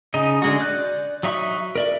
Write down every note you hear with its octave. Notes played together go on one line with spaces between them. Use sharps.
C#3 D#4 D#5
D3 G#3 F#4
D5 F#6 G6
F#3 D#4 E5 C#6
A#4 D5 E5